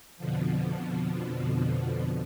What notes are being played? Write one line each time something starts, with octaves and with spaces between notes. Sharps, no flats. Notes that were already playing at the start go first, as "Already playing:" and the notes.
F2 B2 D3 F3